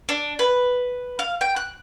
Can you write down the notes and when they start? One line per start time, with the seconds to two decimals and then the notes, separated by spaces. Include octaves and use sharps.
0.09 D4
0.39 B4
1.19 F5
1.41 G5
1.56 F#6